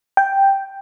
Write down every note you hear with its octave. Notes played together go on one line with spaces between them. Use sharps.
G5